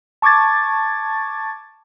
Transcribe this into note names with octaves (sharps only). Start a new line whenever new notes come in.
A5 C#6 D6 G#6 A6